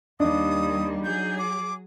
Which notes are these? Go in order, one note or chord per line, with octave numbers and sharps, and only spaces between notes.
D#2 G3 D4 D#4 D#6
F#3 G#4 G6
D6